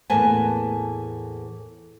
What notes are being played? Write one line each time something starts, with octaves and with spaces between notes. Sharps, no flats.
E2 A2 A#3 B4 G#5 A5